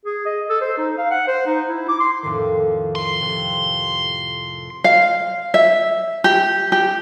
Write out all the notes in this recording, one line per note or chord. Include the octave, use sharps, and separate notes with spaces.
G#4
D#5
A4
C5
D#4
F5
F#5
C5
D#4
E4
D6
C6
F2 A2 D#3
C6
F2 C3
F5
E5
G4
G4